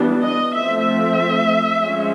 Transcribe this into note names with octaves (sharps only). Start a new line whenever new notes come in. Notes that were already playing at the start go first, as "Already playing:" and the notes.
Already playing: E3 G3 B3 D4
D#5
F3 A3 C4 E5
E5
F3 G#3 C#4